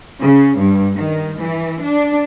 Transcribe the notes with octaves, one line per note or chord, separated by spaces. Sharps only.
C#3
G2
D#3
E3
D4